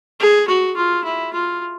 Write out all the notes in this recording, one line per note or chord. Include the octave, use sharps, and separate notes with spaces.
G#4
F#4
F4
E4
F4